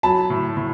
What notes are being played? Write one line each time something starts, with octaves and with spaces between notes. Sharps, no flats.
F#3 A5 B5
A2
A2